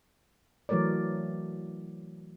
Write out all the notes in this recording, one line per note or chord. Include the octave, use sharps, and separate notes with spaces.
E3 F#3 A3 A#4 C#5 D5